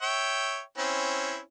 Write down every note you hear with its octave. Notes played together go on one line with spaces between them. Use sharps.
C#5 E5 G5
C4 C#4 E4